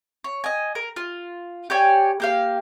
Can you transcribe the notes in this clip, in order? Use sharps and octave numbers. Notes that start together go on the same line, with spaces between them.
C#5
D#5 G#5
A#4
F4
G4 C#5 D5 G#5
A#3 G4 F5